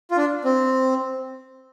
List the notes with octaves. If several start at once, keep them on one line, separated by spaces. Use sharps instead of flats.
F4
D4
C4